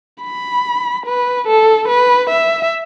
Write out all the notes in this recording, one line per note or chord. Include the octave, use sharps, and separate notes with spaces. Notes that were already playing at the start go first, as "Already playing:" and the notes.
B5
B4
A4
B4
E5